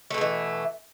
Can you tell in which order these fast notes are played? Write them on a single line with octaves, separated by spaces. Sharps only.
A3 B2 G#3 E3